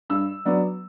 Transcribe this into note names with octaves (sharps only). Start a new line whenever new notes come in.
G2 E6
F#3 B3 D4